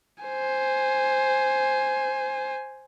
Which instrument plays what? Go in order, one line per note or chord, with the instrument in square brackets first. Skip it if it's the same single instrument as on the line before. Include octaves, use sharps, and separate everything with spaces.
[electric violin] C5 G#5